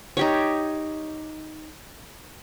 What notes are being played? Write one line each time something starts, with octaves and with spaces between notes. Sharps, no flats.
D#4 G4 C#5